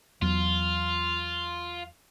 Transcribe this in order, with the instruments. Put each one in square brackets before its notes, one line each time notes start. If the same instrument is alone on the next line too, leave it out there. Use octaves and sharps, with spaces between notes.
[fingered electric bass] E2 F#3 [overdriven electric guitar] F4